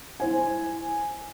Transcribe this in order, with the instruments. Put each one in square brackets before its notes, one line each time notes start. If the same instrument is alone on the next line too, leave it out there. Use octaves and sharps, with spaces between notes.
[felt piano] E4 C5 G#5